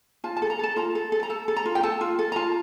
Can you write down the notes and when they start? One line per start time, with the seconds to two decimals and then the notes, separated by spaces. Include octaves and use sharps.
0.24 F4 A5
0.37 A5
0.42 A4
0.50 A#5
0.59 A4 A5
0.76 F4 A#5
0.95 A4
1.12 A4
1.23 A#5
1.30 A4 A5
1.48 A4
1.56 A#5
1.65 F4
1.75 G5
1.83 A4 A5
2.01 F4
2.19 A4
2.32 A#5
2.36 F4 A5